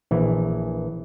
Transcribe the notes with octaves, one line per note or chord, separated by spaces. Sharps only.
A#1 E3